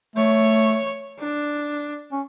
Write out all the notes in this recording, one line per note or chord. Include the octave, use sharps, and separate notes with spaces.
A3 C#5
D4
C#4